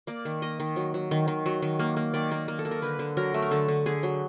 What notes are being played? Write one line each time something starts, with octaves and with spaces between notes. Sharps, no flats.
A#3 D5
D#3
A#3 D#5
D#3
F#3
F#3
D#3
D#3
F#3
D#3
A#3
A#3
D#3 D5
A#3
A#3
A4
A#3
A#4
D3 B4
D3
F#3 A#4
A3
A#4
D3 A4
D3
D3 G#4
F#3